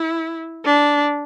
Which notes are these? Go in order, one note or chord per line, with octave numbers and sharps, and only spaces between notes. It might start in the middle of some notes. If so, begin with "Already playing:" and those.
Already playing: E4
D4